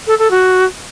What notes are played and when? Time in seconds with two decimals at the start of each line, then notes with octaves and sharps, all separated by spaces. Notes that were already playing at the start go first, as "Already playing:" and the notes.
0.07 A4
0.18 A4
0.30 F#4